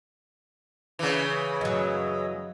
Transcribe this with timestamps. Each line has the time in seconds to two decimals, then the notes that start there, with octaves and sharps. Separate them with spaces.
0.99 C#3 E3
1.61 F#2 F#3 D#5